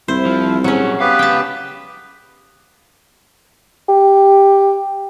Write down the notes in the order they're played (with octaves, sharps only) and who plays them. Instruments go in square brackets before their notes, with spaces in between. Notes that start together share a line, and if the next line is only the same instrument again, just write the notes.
[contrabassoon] C2 [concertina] E4 [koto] C5
[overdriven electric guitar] F3
[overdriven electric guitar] A#2 G#4 [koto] F#3 C#4 [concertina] F#5
[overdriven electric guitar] C#2 F5 [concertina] B3 G4 B4
[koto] G5 A5
[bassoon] G4